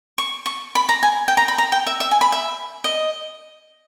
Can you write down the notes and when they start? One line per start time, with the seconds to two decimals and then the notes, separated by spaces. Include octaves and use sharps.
0.18 C#6
0.46 C#6
0.75 B5
0.89 A#5
1.03 G#5
1.28 G5
1.37 A#5
1.48 B5
1.58 A#5
1.72 G5
1.87 E5
2.00 E5
2.11 G#5
2.21 B5
2.32 E5
2.84 D#5